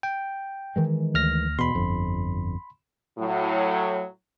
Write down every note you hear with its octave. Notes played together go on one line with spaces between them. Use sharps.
G5
D#3 E3 G#3
D2 F6 A#6
E2 B2 B5 C6
G1 F2
A2 F#3